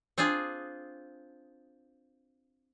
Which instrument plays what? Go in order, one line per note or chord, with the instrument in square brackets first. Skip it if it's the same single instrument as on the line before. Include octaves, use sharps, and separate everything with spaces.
[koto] C4 D4 F4 G#4